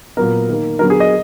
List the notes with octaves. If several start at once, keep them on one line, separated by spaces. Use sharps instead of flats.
A#2 F#3 B3 A#4
D#3 A#3
D3 F#3 B3 A#4
G#4
D#5